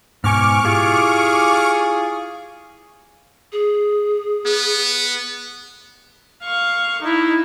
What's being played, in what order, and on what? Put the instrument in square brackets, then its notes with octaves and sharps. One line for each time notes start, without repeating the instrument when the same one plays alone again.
[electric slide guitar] G#2 B2 G#5 [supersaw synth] C#6 D6 F6
[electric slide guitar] E4 F4 G4 [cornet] G#4
[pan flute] G#4
[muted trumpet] B3
[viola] F5 C#6
D#4 E4